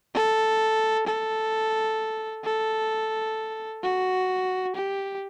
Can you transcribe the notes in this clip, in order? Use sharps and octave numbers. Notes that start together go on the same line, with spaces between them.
A4
A4
A4
F#4
G4